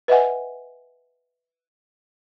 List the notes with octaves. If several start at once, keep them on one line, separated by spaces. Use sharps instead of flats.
B4 D#5 E5 F#5 G#5